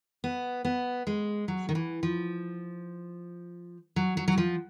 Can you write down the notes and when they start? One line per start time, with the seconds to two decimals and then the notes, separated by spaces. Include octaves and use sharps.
0.24 B3
0.65 B3
1.07 G#3
1.48 F#3
1.69 D#3
1.75 E3
2.03 F3
3.96 F#3
4.17 F#3
4.28 F#3
4.38 F3